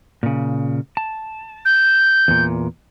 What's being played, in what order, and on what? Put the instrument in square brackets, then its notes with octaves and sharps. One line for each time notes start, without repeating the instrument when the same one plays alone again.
[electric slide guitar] A#2 C#3
A5
[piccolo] G6
[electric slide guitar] E2 A#2